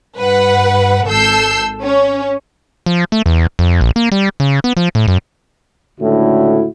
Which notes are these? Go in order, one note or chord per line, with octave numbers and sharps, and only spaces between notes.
G2 B4 F#5
G#1 A4 E6 G6 C7
C#4
F3
A3
E2
F2
A#1
A#3
G3
C#3
B3
F3
A2
F#2
C#2 A2 D3 E4 F#4